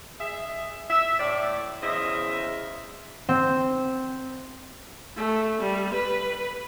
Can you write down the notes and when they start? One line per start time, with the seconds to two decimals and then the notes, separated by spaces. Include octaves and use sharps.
0.20 G#4 D#5 E5
0.90 E5
1.20 A2 D5
1.83 E2 C#3 C5 D#5 E5
3.29 C4
5.17 A3
5.61 G3
5.94 B4